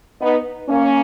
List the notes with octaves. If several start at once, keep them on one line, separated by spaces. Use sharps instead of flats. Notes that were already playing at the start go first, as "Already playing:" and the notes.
B3 D#4
A#3 C#4